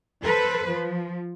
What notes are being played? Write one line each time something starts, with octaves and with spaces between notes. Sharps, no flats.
A4 B4 C5
F3